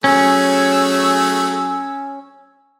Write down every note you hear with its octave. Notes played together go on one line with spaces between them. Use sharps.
F#3 A3 C#4 G#4 E6